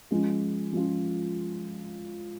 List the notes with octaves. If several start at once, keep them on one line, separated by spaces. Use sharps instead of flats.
F3 G#3 C#4 F4
F3 G#3 C#4 F4